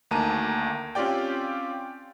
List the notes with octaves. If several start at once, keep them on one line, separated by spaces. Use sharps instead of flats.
D2 D#3 A#3 A5 A#5 D#7
C4 C#4 F4 G4 D5 G5